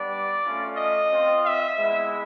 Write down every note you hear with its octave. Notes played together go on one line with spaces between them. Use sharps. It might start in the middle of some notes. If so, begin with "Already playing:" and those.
Already playing: G3 B3 D4 D5
A3 C#4 F4
D#5
C4 F4
E5
G#3 B3 E4